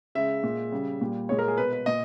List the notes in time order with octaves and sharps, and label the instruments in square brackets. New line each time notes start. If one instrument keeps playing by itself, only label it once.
[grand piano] C#3 G#3 E5
A#2 G#3
C#3 G3
A#2 G3
A#2 G#3 C#5
A#4
G#4
B2 G#3 B4
B4
A#2 D#5